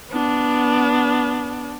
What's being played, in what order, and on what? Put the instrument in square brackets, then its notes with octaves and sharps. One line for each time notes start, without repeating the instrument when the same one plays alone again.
[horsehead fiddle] B3 D4